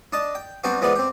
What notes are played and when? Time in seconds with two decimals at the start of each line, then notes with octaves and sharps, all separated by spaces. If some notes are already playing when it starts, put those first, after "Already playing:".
0.13 D4 D#5 A5
0.35 G5
0.64 G3 B3 C4 D4 F#4 G4
0.81 E3 F3 G#3 B3 B4 D5
0.95 C4 G4